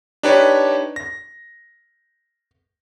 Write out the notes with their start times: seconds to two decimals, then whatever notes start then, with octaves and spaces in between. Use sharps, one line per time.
0.23 D4 D#4 G4 B4 C#5
0.96 A#6